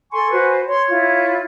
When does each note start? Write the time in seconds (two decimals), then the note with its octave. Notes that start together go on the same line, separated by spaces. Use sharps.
0.12 A4 G#5 C6 C#6
0.32 F#4 B4 C5
0.68 C#5 C6
0.90 E4 F4